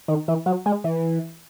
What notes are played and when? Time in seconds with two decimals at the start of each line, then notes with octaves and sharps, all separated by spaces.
0.08 D#3
0.28 E3
0.46 F#3
0.66 G#3
0.84 E3